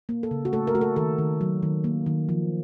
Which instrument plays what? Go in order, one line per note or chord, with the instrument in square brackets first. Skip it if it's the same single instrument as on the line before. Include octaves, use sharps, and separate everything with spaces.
[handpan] A#3
A4
C#3
F#4
A3 A4
A#4
A3 F#4
A4
D#3 A4
D#3
F#3
D#3
A#3
D#3
F3